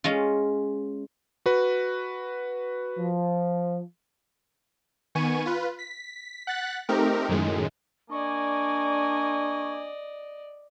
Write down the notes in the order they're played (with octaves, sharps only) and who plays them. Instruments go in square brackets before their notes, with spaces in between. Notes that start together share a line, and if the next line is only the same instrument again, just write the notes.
[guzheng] G#3 C#4 F4
[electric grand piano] F#4 B4
[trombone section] F3
[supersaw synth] D#3 B3 G#5 C#6 D#7
F4 B4
B6
F#5 F#6 A6 B6
A3 C4 D#4 G4 A#4
F#2 A2 D#3 G#3
[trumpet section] A#3 G#5 D6 [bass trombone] D4 [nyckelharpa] D5 D#5 [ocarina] C#6